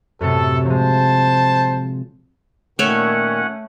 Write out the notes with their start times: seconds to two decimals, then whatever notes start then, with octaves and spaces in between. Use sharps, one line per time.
0.21 F#2 A2 C3 A4
0.66 F3 G#3 C5 A5
2.79 A#2 D#3 A3 C#4 C#5 F#5